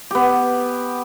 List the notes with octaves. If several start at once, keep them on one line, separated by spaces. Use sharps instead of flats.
B3 G4